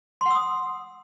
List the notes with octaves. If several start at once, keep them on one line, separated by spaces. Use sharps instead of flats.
F#5 C6 D#6 E6